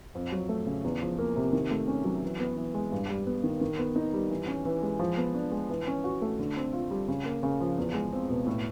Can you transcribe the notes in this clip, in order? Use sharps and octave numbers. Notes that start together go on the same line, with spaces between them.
F2
F#3
A3
C#3
E2
F3
A#3
C3
D#3
A3
C#4
F#3
E3
B3
E3
G#3
G2
G3
B3
D#3
D#3
B3
D#4
G3
E3
C#4
E3
G#3
F3
B3
D4
G#3
E3
C#4
F#4
A3
D3
C4
F4
G3
C#3
A#3
C#3
F3
E2
G#3
C4
B2
A2